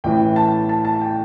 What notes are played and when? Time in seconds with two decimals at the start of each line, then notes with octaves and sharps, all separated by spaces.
0.04 A1 A2 E3 G5
0.36 A5
0.69 A5
0.85 A5
1.01 G5